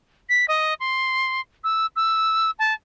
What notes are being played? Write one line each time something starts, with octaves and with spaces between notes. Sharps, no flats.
B6
D#5
C6
E6
E6
A5